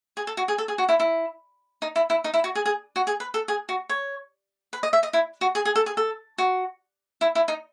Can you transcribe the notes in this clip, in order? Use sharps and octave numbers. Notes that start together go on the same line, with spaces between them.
G#4
A4
F#4
G#4
A4
G#4
F#4
E4
E4
D#4
E4
E4
D#4
E4
F#4
G#4
G#4
F#4
G#4
B4
A4
G#4
F#4
C#5
B4
D#5
E5
D#5
E4
F#4
G#4
G#4
A4
G#4
A4
F#4
E4
E4
D#4